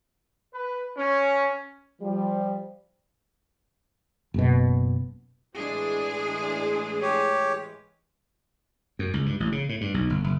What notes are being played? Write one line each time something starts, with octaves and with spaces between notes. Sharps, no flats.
B4
C#4
F3 G3
F#1 B2
A2 E3 G#3 D4 G#4
G4 C#5
F#2
C#2
G2
A1
C#3
A2
G2
B1
G1
F#1